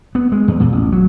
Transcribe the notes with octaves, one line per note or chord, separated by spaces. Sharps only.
B3
G#3
E2
A#2
A1
F#3